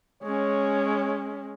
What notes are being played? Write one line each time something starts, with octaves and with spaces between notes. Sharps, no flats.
G#3 C#4 C#5